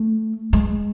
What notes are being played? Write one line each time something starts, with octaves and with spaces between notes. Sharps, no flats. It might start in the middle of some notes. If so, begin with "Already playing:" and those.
Already playing: A3
G#3